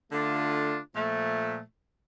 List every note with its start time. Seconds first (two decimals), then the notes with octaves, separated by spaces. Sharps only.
0.12 D3 A3 D4 F4
0.95 A#2 F3 A3